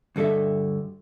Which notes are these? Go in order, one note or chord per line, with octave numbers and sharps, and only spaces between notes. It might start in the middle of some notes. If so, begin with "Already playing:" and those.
D2 G2 A4 D#5 E5